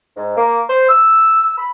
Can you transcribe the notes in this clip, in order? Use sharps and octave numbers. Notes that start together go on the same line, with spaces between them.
G#2
A#3
C5
E6
B5